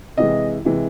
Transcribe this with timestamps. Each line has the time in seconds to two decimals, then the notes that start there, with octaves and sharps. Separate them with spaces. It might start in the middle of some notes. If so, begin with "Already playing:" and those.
0.17 C3 E3 G#3 D#5
0.65 C3 E3 G#3